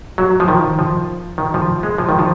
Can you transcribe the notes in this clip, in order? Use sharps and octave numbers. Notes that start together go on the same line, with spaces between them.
F#3
F3
D#3
F3
D#3
F3
G#3
F3
D#3
F3